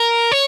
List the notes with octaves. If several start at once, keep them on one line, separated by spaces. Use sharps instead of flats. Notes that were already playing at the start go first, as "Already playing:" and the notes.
Already playing: A#4
C#5